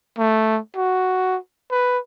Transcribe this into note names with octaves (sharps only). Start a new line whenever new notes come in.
A3
F#4
B4